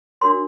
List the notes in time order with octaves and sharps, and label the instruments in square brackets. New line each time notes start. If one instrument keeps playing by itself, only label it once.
[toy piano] D4 F#4 A#4 C#5 C6